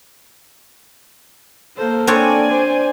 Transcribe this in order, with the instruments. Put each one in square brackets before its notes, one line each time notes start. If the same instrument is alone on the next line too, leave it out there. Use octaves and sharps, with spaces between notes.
[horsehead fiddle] A#3 A4 [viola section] C5
[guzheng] C4 D4 C#5 [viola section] D5 G#5
[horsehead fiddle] C5